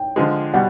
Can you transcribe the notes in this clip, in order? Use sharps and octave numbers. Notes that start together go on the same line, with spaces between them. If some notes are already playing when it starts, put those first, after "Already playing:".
Already playing: G5
D3 F3 G#3
B2 G3 F#5